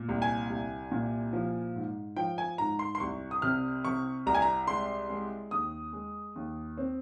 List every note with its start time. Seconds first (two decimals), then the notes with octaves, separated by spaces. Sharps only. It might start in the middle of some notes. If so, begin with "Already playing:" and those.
Already playing: A#2
0.09 C2
0.22 G#5
0.50 C2
0.92 A#2
1.33 F3
1.76 G#2
2.16 F3 G5
2.38 G#5
2.58 G#2 A#5
2.79 C6
2.95 C6
3.00 C2 C#6
3.31 D#6
3.42 C3 F6
3.85 C3 C#6
4.26 C2 A#5
4.35 G#5
4.42 A#5
4.67 G#3 C6
5.10 G#3
5.51 D#2 D#6
5.93 G#3
6.36 D#2
6.78 C4